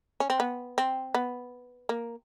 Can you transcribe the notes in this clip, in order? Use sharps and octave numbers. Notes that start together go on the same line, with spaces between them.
C#4
C4
B3
C4
B3
A#3